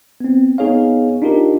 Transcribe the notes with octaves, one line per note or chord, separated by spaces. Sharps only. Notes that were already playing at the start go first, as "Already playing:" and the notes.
B3 C4
B3 D#4 G#4 C#5 F5
D4 D#4 F4 G4 A#4